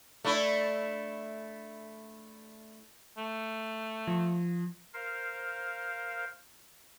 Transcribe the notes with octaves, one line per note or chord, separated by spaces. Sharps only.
A3 D4 E4
A3
F3
A#4 C5 F5